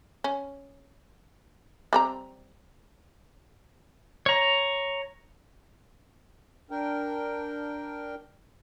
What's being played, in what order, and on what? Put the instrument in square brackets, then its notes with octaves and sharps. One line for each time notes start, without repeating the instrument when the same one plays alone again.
[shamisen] C#4
G3 C4 A#5
[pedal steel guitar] C#5 A#5
[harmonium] D4 A#4 G5